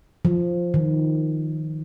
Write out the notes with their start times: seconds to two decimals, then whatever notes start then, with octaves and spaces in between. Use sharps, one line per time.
0.25 F3
0.74 D#3